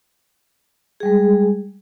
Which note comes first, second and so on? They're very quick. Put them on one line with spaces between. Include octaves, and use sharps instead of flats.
G#4 G3 G#3